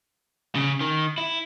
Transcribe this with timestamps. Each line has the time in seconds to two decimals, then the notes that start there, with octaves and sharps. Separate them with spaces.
0.55 C#3
0.81 D#3
1.18 E4